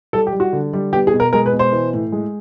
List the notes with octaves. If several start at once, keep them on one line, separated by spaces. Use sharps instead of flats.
G3 A4
G4
G3
F#4
D3
G3
B3 G4
G#4
B2
A#4
G#3 A#4
B4
B2
C5
E3
A2
G#3